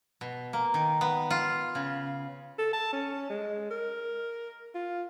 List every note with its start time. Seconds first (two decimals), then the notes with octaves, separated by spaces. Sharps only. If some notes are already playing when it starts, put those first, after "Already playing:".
0.21 B2
0.53 A#3
0.74 D#3
1.01 B3
1.31 F4
1.75 C#3
2.58 A4
2.73 A5
2.93 C#4
3.30 G#3
3.71 A#4
4.75 F4